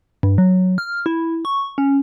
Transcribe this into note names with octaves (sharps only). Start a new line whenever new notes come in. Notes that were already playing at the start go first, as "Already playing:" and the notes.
G2
F#3
F6
E4
C#6
C#4